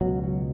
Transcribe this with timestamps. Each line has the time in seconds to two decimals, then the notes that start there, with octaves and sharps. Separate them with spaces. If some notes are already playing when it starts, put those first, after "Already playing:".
0.01 C#2 B2 F#3
0.23 F#3